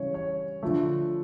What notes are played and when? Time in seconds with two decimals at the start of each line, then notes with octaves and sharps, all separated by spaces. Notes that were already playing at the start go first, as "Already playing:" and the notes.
Already playing: C#3 E3 G3 C#5
0.14 C#5
0.63 D3 F3 A3